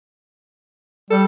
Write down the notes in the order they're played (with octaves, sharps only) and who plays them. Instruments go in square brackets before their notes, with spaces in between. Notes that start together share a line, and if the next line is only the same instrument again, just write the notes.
[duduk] G3 [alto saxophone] A4